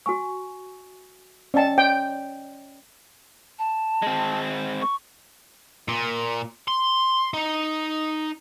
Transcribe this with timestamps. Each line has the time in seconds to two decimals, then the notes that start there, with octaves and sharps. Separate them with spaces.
0.06 F#4 G#5 C#6
1.54 C#4 D5 D#5 G5 A5
1.78 C#5 G5
3.59 A5
4.02 G#3 C4
4.82 C#6
5.88 A#2
6.68 C6
7.34 D#4